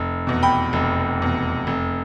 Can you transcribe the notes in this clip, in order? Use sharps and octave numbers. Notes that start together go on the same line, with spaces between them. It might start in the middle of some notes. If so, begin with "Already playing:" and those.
Already playing: F1
E2 B2
G5 B5
F1
E2 B2
F1